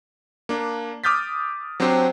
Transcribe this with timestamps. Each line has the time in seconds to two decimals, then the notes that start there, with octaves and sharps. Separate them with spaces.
0.49 A#3 D4
1.04 D6 D#6 F6 G6 A6 B6
1.80 F#3 C4 D4 G4 C5